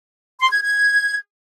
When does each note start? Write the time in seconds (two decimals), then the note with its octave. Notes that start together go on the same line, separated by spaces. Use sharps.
0.40 C6
0.51 G#6
0.62 G#6